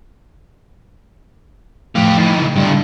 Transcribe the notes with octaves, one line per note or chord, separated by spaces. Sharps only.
A2 F3 A3 G4 F5
D#3 E3
C#3
G2 D3